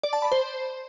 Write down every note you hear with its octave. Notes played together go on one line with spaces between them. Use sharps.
D5
A5
B5
C5